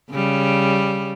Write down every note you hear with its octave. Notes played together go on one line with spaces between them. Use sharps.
C#3 G3